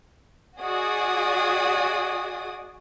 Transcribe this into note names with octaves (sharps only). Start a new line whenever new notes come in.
F#4 G#4 D5 D#5 G#5 D#6